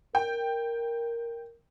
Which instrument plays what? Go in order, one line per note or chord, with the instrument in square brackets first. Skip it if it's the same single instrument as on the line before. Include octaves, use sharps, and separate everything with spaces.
[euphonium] A#4 [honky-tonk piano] G5